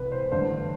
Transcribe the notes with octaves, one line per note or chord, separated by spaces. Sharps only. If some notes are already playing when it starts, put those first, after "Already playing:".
Already playing: C2 C3 E3 B4
C5
A1 G2 D3 C5